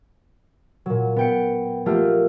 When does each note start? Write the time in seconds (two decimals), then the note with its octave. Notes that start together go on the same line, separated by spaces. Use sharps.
0.86 A#2 F#3
1.16 B3 G5 C#7
1.86 F3 A3 A#3 F4 G4